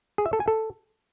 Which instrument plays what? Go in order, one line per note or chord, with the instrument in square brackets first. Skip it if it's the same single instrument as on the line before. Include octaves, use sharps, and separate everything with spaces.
[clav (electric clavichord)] G#4
E5
A4
G#5
A4